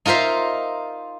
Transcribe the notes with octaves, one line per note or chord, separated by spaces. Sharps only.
D#4 F4 A#4 C5 E5